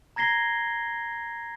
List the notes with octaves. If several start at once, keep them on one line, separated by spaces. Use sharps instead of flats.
A#5 G#6 A#6 C7 G7